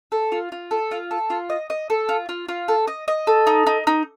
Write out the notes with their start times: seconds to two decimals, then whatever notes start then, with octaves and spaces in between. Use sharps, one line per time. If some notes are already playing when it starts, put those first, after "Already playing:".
0.12 A4
0.32 F4
0.52 F4
0.71 A4
0.91 F4
1.11 A4
1.30 F4
1.50 D#5
1.70 D#5
1.90 A4
2.09 F4
2.29 F4
2.49 F4
2.68 A4
2.87 D#5
3.08 D#5
3.27 A4
3.47 D#4
3.67 D#4
3.87 D#4